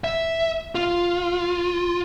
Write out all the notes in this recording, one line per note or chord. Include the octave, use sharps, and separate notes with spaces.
E5
F4